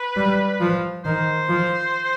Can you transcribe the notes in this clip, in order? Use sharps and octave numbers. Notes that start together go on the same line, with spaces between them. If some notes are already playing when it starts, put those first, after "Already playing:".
Already playing: B4
G3
F3
D#3 C5
F3